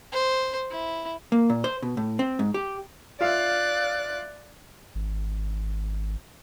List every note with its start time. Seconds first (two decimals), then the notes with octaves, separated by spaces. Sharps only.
0.12 C5
0.71 E4
1.32 A#3
1.50 A#2
1.64 C5
1.82 B2
1.97 A2
2.19 C4
2.39 G#2
2.54 G4
3.21 F4 D5 E5 F5 F#6
4.95 G#1